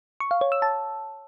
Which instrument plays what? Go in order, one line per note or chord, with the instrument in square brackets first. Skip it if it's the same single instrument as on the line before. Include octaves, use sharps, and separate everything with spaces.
[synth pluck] C#6
F5
C#5
E6
A5